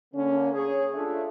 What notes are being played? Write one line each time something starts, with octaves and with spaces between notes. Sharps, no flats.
D3 A#3 C#4
G#4 C#5
A3 D4 F4 E5